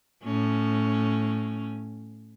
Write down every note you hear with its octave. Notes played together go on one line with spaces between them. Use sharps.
A2 C#4